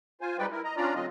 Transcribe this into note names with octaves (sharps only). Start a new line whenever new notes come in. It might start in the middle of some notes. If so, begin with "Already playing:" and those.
F4 C5 G#5
G3 G#3 D#4 B4 D5 G5
E4 A#4
D#5 A#5
C#4 D4 F4 D5 A#5
D3 F#3 C4 F4 D#5